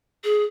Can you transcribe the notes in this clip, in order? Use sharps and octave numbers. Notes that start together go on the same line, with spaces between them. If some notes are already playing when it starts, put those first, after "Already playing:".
G#4